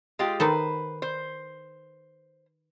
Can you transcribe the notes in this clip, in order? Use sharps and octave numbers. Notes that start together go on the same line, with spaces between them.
G#3 F4 G4
D#3 D#4 A4 B4 C5
C5